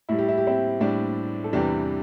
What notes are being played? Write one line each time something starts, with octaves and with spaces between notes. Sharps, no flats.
A2 G3 E4
G4
E4
G4
C4 E4
A2 G3 D4 G4
A4
E2 C3 E3 G3 D4 G4